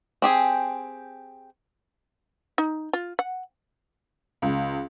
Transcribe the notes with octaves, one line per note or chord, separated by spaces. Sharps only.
C4 G4 G#4
D#4
F4
F#5
C#2